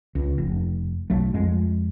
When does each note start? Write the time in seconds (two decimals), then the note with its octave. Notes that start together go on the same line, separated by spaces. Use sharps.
0.15 C#2
0.38 F1
1.10 B1 F#3 A3
1.34 F2 G#3